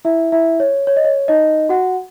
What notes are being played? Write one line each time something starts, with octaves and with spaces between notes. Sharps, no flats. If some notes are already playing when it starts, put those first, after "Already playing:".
E4 E5
E4 E5
C#5
C#5
D#5
C#5
D#4 D#5
F#4 F#5